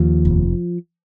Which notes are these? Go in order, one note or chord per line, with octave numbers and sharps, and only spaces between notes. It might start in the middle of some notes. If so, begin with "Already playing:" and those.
Already playing: D#2 F3
F1